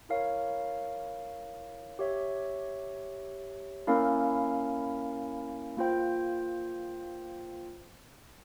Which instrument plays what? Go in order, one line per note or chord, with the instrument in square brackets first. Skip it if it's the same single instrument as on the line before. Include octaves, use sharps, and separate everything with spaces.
[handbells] E4 A#4 C#5 F5
G4 C#5 E5
A#3 C#4 E4 A#4 F5
A#3 F4 C5 G5